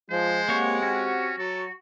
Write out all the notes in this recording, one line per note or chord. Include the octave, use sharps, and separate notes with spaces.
F3 G#3 C5
A#3 C4 G4 C#5 F#5
C#4 F#4
F#3 A4